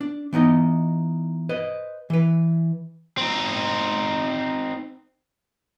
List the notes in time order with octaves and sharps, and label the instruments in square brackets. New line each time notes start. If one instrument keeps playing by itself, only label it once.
[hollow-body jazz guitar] D4
E3 B3 D#4 D#5
B4 C5 D#5
E3 B4
[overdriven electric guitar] C4 D#4